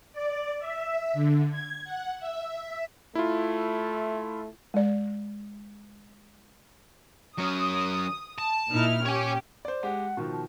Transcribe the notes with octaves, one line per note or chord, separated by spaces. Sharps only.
D5
E5
D3
G#6
F#5
E5
A3 E4 F4
G#3 D5
F#3 C#4 D#6
A5
A#2 D#4 E4 F6
C#4 G4 C#5 G#5
C5 D5
G#3 G4 F#5
B2 D#3 F3
A5